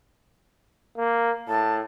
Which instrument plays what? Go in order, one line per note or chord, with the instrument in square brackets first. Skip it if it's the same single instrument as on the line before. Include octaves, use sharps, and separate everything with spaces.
[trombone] A#3
[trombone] A2 [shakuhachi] A5